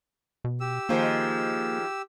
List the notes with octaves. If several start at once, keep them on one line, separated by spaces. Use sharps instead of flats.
B2
G4 E6
D#3 F3 G#3 A#3